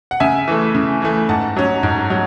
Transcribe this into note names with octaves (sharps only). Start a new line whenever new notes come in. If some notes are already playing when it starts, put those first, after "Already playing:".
F#5
C#3 E5 G#5
E3 A3
C#3
E3 A3
G#2 F#5 A5
F#3 C#4
G#2
F#3